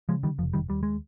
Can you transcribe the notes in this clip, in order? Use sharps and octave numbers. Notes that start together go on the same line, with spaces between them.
C#3 F3 G#3
D#3 G3
F1 F3
D#3 G3
D#2 G3
G#3